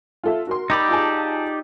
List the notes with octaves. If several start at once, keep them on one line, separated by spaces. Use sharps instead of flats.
F4 A4 E5
F#4 A#4 C6
D#4 G4 D5 B5 E6
F4 G#4 A5